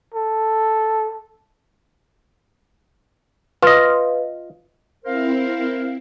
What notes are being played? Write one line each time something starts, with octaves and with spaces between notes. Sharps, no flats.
A4
F4 B4 D#5
C4 E4 A#4 C5 F5